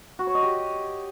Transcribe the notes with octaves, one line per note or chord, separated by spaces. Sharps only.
F#4
C#5
D#5
G4